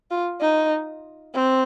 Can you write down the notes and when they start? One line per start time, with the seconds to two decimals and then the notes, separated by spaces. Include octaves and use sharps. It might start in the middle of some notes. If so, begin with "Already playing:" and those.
0.11 F4
0.41 D#4
1.35 C4